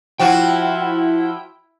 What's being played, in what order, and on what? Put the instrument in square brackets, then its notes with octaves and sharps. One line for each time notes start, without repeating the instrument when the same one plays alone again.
[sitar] F3 F#4 [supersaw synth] E4 [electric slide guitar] G5